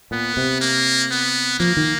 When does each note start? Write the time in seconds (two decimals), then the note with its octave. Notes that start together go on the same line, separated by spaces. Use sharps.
0.11 A#2 B3
0.37 C3
0.61 A#3
1.10 B3
1.60 F3 A#3
1.77 D#3